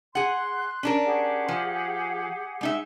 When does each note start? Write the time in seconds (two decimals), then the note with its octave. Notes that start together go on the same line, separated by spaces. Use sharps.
0.15 G#4 F#5 C6 F#6
0.83 C#4 D4 A#4
1.06 G4 G#4 F#5
1.48 F3
2.61 G#3 D#4 E5